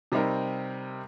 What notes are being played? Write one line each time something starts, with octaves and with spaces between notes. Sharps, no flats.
C3 G3 C4 D#4 A#4